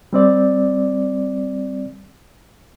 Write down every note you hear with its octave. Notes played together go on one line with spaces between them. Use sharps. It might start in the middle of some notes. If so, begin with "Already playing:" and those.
G3 C4 D5